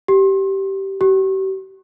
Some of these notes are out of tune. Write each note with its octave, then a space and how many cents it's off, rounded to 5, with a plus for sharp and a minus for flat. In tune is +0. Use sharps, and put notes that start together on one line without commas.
G4 -15
G4 -40